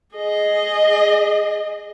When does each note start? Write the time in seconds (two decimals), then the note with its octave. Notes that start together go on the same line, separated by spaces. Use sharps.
0.16 G#4 D#5